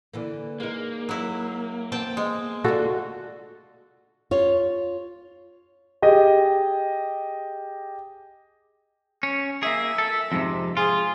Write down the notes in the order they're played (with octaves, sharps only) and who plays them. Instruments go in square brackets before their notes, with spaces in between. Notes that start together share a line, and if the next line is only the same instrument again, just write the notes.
[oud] D3 E3 A#3
[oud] G#3 D#4 [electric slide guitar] A#3
[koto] F#3 E4
[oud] B3 C4 [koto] G5 A5
[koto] G#3
[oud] D4 D#4 F4 [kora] F#4 A4
[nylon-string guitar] F4 C#5
[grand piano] G4 G#4 D#5
[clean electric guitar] C#4
[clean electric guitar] A#3 G#4 [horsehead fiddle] E5
[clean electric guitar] A4
F2 G#2 C3
[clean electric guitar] F4 [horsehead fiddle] G#4